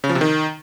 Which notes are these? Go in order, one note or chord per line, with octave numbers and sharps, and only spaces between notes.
C#3
F3
C3
D#3